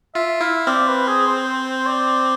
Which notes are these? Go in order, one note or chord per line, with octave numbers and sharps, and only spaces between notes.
F4 E5
E4 F5
C4 D5
B4
G#4
C5
C5
D5